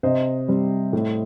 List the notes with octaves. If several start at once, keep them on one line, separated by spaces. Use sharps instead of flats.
C3 C5 D#5
G3 C4
A2